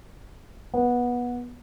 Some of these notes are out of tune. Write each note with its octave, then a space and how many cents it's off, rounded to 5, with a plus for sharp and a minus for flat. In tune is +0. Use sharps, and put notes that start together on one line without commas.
B3 -20